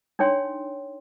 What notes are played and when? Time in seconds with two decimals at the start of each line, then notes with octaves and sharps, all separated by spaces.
0.19 D4 D#4 C#5 G5 C6